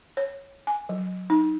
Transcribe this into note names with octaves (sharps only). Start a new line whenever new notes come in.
C#5
G#5
F#3
D#4